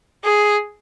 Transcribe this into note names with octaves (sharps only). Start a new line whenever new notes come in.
G#4